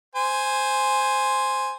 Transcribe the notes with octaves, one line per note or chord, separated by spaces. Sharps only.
C5 G#5